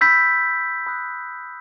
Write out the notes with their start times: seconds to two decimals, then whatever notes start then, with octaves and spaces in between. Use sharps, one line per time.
0.01 B5 E6 G6 B6
0.87 B5 D#6 F#6